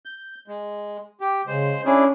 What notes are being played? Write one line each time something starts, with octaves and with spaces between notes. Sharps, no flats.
G6
G#3
G4
C#3 G#3 C5
C#4 D4 E4 G#4